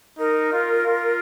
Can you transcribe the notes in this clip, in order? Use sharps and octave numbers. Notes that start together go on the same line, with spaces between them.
D#4 A#4
F4
F4